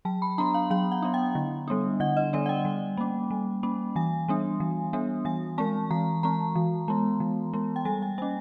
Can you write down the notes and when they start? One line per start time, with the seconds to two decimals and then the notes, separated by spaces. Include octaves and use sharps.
0.05 F#3 A5
0.22 B5
0.38 B3 D4 A#5
0.54 F5
0.70 F#3 F5
0.92 F#5
1.02 B3 D4
1.14 G5
1.35 D3
1.68 G3 B3 D4
2.00 D3 F#5
2.17 D#5
2.33 G3 B3 D4 D5
2.46 F#5
2.49 G5
2.65 G3
2.97 A#3 C#4
3.30 G3
3.63 A#3 C#4
3.96 E3 G#5
4.28 G3 B3 D4
4.60 E3
4.93 G3 B3 D4
5.25 E3 G#5
5.58 G#3 C4 A5
5.91 E3 A#5
6.23 G#3 C4 A#5
6.55 E3
6.88 G#3 B3
7.20 E3
7.53 G#3 B3
7.76 G5
7.85 G3 G#5
8.02 G5
8.18 A#3 C#4 G#5